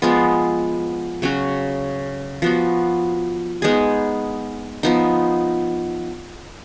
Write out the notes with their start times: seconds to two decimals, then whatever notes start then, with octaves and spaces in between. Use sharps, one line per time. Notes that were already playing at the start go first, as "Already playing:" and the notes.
0.02 F3 G#3 B3 F4
1.22 C#3 F#3 C#4 F#4
2.42 F3 B3 F#4
3.62 G#3 B3 D#4 G#4
4.83 F3 B3 D#4